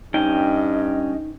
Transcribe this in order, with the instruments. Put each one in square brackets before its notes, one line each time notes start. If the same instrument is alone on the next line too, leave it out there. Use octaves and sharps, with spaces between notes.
[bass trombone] G2 [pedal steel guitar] C#4 G5 [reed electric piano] D#4 [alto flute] D#5